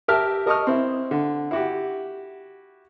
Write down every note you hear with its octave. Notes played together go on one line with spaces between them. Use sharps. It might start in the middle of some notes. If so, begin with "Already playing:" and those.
G4 A#4 E5 A5 F6
A#4 D#5 A5 C#6 D#6 F6
C4 E4
D3
E4 F#4 G4